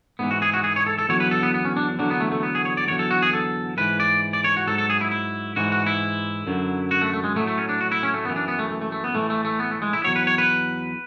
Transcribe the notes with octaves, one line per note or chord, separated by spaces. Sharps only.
G#2 E3 B3
F#4
G#4
F#4
G#4
C#5
A4
A4
E2 D3 F#3 C#5
B4
A4
B3
B3
C#4
D4
E2 D3 F#3 D4
B3
A3
A3
B3
G#4
C#5
D5
E2 D3 F#3 C#5
A4
F#4
G#4
A4
G#2 E3 B4
D5
D5
C#5
F#4
G#2 F#3 A4
A4
G#4
E4
E4
G#2 E3 F#4
F#4
E4
F#2 D3 F#3
F#4
A3
A3
G#3
A2 F#3 A3
A3
C#4
D4
F#4
E4
C#4
A3
F#2 E3 B3
D4
B3
A3
A3
A3
A3
B3
A2 E3 A3
A3
A3
B3
A3
G#3
E4
E2 B2 F#3 C#5
B4
C#5
B4